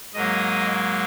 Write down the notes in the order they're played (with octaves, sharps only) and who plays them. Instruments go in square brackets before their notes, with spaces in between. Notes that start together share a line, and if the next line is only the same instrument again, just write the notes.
[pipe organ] G#2 F#3 A#3 D#5